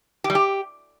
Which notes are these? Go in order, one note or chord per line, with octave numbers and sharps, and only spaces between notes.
G4
G3
G4